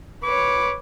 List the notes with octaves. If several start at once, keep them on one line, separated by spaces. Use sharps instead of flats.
B4 C#5 D6